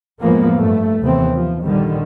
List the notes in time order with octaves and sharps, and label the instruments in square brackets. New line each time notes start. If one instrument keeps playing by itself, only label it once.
[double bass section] F#2 A2 F3 G#3 A#3 B3
G2 A3
D#2 C3 E3 B3 C4
F3
A#1 D3 D#3 G3